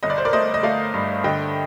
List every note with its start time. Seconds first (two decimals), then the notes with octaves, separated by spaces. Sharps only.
0.03 G1 D#5
0.10 D5
0.18 C5
0.25 A#4 D5
0.33 A3 C5 D#5
0.54 D#5
0.63 A3 D5 F5
0.94 G2
1.24 D3 D#5 G5